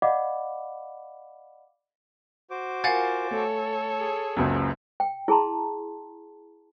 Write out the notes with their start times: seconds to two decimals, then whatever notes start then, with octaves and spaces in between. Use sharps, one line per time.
0.02 D5 D#5 F5 F#5 B5 D6
2.50 F#4 C5 D6
2.84 F4 A#4 F5 F#5 G#5 A6
3.31 A3 A4 C#5
4.00 G#4
4.37 F#1 C#2 F#2
5.00 G5
5.28 E4 G#4 A5 A#5 C6